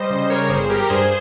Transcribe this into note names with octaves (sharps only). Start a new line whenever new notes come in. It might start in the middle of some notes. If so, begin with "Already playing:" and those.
Already playing: G3 C5 D#5
C#3
G3 A#4 C#5
G1 G#4 C5
G3 G4 A#4
G2 G#4 C5